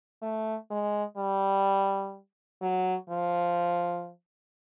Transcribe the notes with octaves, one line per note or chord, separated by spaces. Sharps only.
A3
G#3
G3
F#3
F3